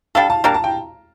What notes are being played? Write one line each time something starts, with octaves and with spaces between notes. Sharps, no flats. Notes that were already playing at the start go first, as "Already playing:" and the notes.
G3 D4 A4 F5
A5
G3 A#3 D4 A#5
A5
G5